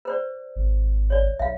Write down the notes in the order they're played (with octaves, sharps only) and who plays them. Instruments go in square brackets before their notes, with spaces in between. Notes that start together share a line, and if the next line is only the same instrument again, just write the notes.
[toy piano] B4 C5 D5
[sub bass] G#1
[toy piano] C#5 D5
[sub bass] B1 [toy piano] E5 F5